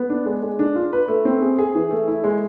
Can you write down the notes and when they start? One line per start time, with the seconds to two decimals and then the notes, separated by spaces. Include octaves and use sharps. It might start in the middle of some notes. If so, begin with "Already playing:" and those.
Already playing: B3
0.10 D4
0.26 G#3
0.42 G#3
0.59 D4
0.76 F4
0.93 B4
1.08 A3
1.25 C4
1.42 G#4
1.59 G#4
1.75 E3
1.91 A3
2.08 E4
2.24 G#3